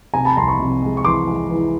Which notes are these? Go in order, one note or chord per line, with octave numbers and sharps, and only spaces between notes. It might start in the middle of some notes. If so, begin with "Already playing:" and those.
C3 G#5 A#5
A5 B5
C2 A#5 C6
B5 C#6
C3
G#3
C#6
E3 C6 D6
G#3
E3